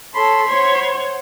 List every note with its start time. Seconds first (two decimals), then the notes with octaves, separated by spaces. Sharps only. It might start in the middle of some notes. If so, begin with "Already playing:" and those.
0.14 A4 C#5 B5 C6
0.49 C5 C#5 F#5